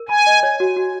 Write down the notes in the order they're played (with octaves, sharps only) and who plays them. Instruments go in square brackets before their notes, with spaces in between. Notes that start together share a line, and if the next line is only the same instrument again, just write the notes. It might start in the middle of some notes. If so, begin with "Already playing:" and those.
Already playing: [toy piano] A#4
[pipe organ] G#5 [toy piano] B5
[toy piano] D#5
C#5
F#4
F#4